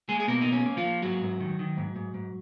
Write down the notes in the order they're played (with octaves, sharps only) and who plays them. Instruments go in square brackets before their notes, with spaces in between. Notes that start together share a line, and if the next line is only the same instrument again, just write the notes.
[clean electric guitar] G#3 A#3 G#4
G#4
B2 A#3 A#4
D#4
A#3
C#4
A#3
F3 F4
A#3
G#2 F#3 F#4
G#2
D#3
D#3
G#2
G#2
G#2